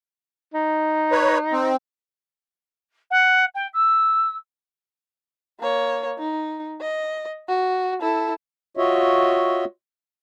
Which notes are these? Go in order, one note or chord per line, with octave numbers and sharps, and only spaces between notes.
D#4
B4 C#5
C4
F#5
G5
E6
A#3 C#5
D#4
D#5
F#4
E4 A4
F4 F#4 C#5 D#5 E5